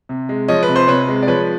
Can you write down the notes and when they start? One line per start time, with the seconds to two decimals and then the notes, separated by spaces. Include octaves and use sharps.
0.09 C3
0.29 G#3
0.48 F3 C#5 D#5
0.63 B4
0.68 C3
0.76 C5
0.88 C3 B4 C#5
1.09 G#3
1.22 D5
1.27 F3 B4 C#5